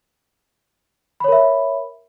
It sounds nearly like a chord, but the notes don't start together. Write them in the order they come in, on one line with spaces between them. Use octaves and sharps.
B5 C#5 A#4 E5